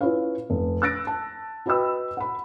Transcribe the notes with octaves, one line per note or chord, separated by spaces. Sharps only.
C#4 E4 F4 B4 C#5 F5
F1
E6 F#6 A6 A#6 D7
A5
F#4 B4 D#5 G5 B5 E6
F#5 B5